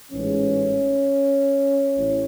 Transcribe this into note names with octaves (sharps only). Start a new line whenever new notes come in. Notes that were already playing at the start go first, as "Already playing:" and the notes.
A1 G#2 E3 G#3 C#4
A1 A2